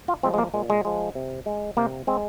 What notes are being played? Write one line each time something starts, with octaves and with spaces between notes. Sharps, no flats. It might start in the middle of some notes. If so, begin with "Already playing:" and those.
F4
F3 G#3 C4
G#3
A#3
A#2 G#3
G#3
F3 G#3
C3
G#3
C3 A#3
G#3 C4